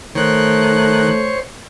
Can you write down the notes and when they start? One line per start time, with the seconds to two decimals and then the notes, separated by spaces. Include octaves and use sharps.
0.15 D#3 A3 C5 C#5 F#6